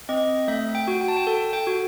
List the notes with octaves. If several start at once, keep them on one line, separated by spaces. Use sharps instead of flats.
C4 D#5
A3 E5
G5
F#4
G5
A5
G5
A4 A5
G5
F#4